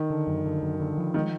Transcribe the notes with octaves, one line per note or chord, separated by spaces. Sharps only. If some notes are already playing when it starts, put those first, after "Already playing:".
Already playing: D#3
D3
F#2
D3
F#2
D3
F3
D#3 G#3